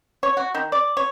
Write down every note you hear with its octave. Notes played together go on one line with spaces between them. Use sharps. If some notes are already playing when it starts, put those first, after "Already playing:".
C#5
F#4
D#3
D5
C#5